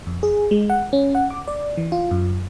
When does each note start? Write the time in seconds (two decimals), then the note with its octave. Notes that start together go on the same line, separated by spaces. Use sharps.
0.07 F2
0.23 G#4
0.51 G#3
0.70 F#5
0.93 C#4
1.15 F#5
1.31 D6
1.48 D5
1.77 E3
1.92 F4
2.11 F#2